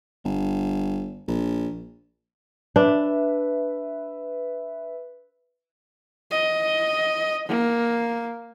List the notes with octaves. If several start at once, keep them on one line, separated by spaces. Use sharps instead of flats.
G1
A#1
D4 B4 E5
D#5
A#3